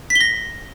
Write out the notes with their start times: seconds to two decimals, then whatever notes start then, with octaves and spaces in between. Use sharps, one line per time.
0.10 B6
0.15 G7
0.21 A#6